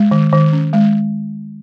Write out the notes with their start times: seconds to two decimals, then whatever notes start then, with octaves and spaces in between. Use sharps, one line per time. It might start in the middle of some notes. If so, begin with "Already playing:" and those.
Already playing: G#3
0.11 D#3
0.32 D#3
0.52 C#4
0.73 G#3